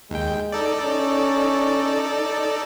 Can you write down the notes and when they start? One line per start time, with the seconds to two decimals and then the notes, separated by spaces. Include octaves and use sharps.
0.11 D#2 G#3 G5
0.52 D#4 A4 D5
0.83 C#4